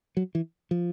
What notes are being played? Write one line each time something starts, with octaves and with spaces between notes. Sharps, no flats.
F#3
E3
F3